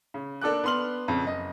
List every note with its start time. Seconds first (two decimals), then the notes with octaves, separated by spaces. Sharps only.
0.14 C#3
0.41 A#3 D4 A4 D6 F#6
0.64 B3 D4 C6 F6 F#7
1.08 F2 C#3
1.24 F#1 D#5